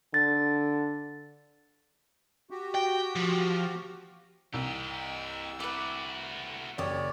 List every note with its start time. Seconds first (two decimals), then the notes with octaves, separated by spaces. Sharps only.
0.14 D3 A6
2.50 F#4 G4
2.75 G5
3.15 F3
4.54 C2 G4 D#5 E6
5.60 A3 F#4 B4 D6
6.78 F#1 G4 C#5 D5 D#6